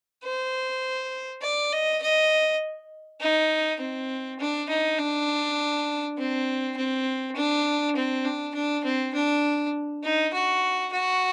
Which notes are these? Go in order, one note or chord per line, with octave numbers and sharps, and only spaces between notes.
C5
D5
D#5
D#5
D#4
C4
D4
D#4
D4
C4
C4
D4
C4
D4
D4
C4
D4
D#4
F#4
F#4